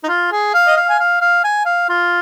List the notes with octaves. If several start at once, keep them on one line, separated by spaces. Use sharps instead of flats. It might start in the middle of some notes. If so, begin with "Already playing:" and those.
D#4
F4
G#4
F5
D#5
F5
G#5
F5
F5
G#5
F5
F4